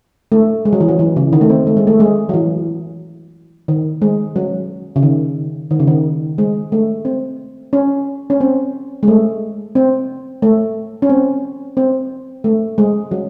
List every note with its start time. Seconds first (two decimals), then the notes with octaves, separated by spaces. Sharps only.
0.32 A3
0.65 G#3
0.73 F#3
0.80 E3
0.88 F#3
0.99 E3
1.16 C#3
1.33 D#3
1.41 A3
1.50 C4
1.67 A3
1.77 G#3
1.87 A3
2.00 G#3
2.29 F#3
2.34 E3
3.68 D#3
4.02 G#3
4.36 F#3
4.96 C#3
5.03 D#3
5.71 D#3
5.80 C#3
5.87 D#3
6.38 G#3
6.72 A3
7.05 C4
7.73 C#4
8.30 C#4
8.41 C4
9.03 G#3
9.08 A3
9.75 C4
10.42 A3
11.02 C#4
11.09 C4
11.77 C4
12.44 A3
12.78 G#3
13.11 F#3